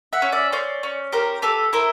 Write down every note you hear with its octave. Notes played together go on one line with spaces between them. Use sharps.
E5 F#5
C#4
D5 E5
C#4 C5 D5
C#4
G4 A#4 C5
G4 A4 B4
E4 A#4 C5